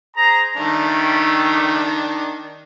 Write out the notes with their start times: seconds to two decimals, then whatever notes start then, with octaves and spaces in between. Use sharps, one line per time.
0.17 G#4 C5 A#5
0.57 D#3 G3 A3 D4